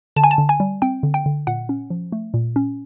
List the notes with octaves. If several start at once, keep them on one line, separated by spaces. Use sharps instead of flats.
D3 A5
G#5
A5
D3
G#5
G3
C4 G5
D3
G5
D3
A#2 F#5
C#4
F3
A3
A#2
C#4